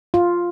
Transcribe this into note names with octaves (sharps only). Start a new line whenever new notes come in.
F4